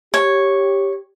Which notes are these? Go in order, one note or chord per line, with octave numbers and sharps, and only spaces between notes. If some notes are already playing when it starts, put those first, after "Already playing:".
G4 C#5